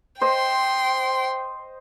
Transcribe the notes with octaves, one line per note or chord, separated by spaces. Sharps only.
C5 D#5 G5 C6